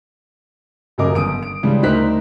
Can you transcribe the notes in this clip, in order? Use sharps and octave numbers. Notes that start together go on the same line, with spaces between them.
D#1 F#2 C#3 A#4 D#5 D6
G1 D#6 D7
D7
C#3 E3 G3 G#3 D4
D2 D#4 A#4 C5 F#6 B6